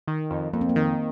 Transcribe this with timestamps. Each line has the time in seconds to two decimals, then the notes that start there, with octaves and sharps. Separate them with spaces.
0.08 D#3
0.31 F2
0.53 F2 A#3
0.61 C4
0.69 A#3
0.76 D#3